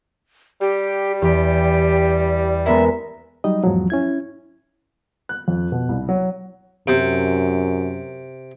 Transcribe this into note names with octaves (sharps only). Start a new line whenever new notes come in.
G3 G4
E2 G4
G#3 B3 A#4 E5
F#3 G3 D#4 D#5
E2 G#2 F3 F#3
C#4 E4 G#6
F#6
F2
B2
C2
F#3
F#2 C3